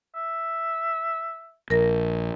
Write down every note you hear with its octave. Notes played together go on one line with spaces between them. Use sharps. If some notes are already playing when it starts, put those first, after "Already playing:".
E5
A#1 A#4 A#6